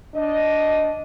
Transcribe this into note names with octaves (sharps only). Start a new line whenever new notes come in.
D4 D#5